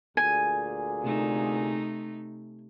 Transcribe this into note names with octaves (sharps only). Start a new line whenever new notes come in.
D2 A#2 G#4 G#5
C3 A3 D#4